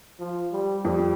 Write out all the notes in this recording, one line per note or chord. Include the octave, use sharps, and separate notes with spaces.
F3
G3
F2 G3